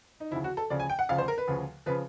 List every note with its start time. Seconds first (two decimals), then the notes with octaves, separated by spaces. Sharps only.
0.20 D#4
0.31 D2 C#3 F3 E4
0.44 F#4
0.57 A4
0.70 D2 C#3 F3 D5
0.80 G#5
0.90 G5
0.99 F#5
1.09 D2 C#3 F3 F5
1.18 C5
1.28 A#4
1.38 B4
1.47 D2 C#3 F3
1.86 C#3 F3 B4